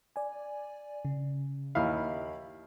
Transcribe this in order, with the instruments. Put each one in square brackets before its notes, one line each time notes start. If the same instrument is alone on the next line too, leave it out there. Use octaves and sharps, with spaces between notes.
[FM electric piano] D5 G#5
C#3
[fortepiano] D#2 E4 F5 [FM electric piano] B5